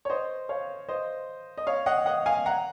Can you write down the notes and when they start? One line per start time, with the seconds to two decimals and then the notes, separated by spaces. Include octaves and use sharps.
0.05 C#5
0.10 C5 D#5
0.49 C#5 F5
0.89 C5 D#5
1.58 D#5
1.67 C#5 F5
1.86 D#5 F#5
2.06 D#5 F#5
2.26 F5 G#5
2.46 F#5 A#5